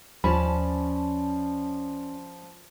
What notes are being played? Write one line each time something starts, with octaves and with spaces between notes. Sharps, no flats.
D#2 F3 C#4 D5 A5 B5